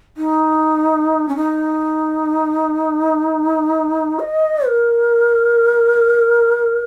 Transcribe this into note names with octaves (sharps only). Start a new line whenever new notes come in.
D#4
C#4
D#4
D#5
A#4